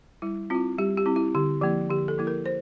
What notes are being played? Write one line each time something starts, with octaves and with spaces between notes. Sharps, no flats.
G3 E4
C4 E4 F4
G3 G4
G4
C4 E4
E4
D3 G4
F3 A#3 E4 G4
D3 G4
A4
F3 A#3 E4
A#4
C5